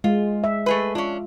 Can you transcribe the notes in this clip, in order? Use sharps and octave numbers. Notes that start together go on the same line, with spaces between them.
G#3 F4
E5
A3 G#4 B4
C#4 D4 F4